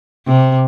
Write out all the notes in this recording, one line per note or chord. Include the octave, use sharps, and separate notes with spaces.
C3